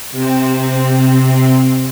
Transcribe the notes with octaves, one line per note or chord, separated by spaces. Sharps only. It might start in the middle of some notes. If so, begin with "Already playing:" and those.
C3 C4